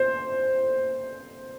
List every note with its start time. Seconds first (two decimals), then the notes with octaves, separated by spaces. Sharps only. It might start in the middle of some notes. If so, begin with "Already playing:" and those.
Already playing: C5